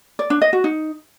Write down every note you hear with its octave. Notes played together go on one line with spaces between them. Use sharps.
D5
D4
D#5
F#4
D#4